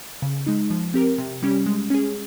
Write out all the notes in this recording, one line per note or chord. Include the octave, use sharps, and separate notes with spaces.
C#3
G#3 D#4
F3
C4 G4 A#4
C3
G3 C#4 G4
G#3
C#4 G#4